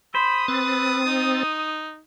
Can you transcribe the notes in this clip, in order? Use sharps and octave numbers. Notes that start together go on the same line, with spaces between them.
C5 B5 D#6
C4 B4 A6
D#4